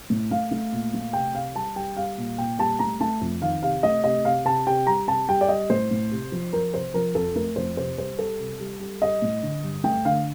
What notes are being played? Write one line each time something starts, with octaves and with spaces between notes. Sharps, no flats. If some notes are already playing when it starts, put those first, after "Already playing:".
A2
A3 F5
A3
A#2
A3
C3 G5
C3 F5
G3 A5
G3 G5
G3 F5
A#2
A#2 G5
G3 A5
A3 A#5
A3 A5
F2
D#3 F5
C3 F5
A3 D#5
C3 D#5
C3 F5
C3 A5
C3 G5
G3 A#5
C3 A5
G3 G5
D5
G3 D#5
A2 C5
A2
C3
F3
F3 A#4
C3 C5
F3 A#4
F2 A4
A3 A#4
F2 C5
C3 C5
G3 C5
G3 A4
C3
G3
G3
G3 D#5
A2
D3
G2
A3 G5
D3 F5